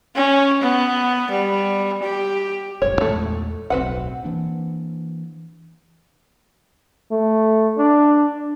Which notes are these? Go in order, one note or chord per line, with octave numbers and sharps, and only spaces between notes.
C#4
B3
G3
G4
F1 A#1 G2 C#5
E2 A#2 G#3 A3
D1 B1 C4 B4 F#5
E3 A#3 D4
A3
D4